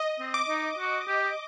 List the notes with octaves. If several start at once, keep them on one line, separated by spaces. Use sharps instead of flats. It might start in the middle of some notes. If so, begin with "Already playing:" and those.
Already playing: D#5
C4
D6
D#4
F#4
G4